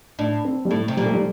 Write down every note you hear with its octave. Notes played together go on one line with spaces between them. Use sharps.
A2 D4
C4
G3
A2 A3
C3
A#2 G3
A3
G3